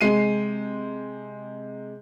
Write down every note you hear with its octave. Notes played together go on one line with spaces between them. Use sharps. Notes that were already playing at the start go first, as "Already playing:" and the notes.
C3 G#3 C7 D#7